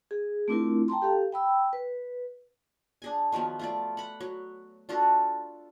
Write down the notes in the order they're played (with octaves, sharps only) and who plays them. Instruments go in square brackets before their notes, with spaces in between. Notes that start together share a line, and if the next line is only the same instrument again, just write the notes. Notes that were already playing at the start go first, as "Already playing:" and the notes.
[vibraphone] G#4
A3 C4 D4 E4 F4 A#4
G5 A5 A#5 C6
G4 A4 F5
G5 B5 E6
B4
[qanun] D4 G#4 G#5
D#3 F3 F#3 B3
A3 F4 D5
F#5 B5
F#3
D4 F4 F#4 A4